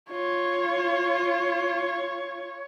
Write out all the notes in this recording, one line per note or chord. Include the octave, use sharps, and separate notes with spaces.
F4 C#5